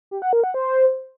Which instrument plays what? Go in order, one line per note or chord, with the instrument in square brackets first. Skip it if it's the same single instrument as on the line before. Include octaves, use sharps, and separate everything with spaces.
[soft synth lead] G4
F#5
A#4
F#5
C5